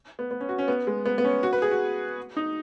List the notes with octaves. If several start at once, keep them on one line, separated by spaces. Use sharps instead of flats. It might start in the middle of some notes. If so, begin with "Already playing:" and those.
B3
B3
C#4
F#4
C#4
B3
G#3
B3
B3
C#4
F#4
B4
G#4
F#4
D#4